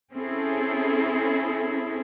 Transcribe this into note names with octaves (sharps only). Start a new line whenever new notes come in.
C4 C#4 E4 G#4 A4